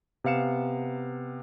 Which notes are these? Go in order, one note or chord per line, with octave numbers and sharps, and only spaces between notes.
C3 B3 F5 C#7 E7